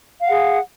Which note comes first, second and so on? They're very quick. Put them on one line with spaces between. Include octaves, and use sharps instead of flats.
F5 F#5 G#4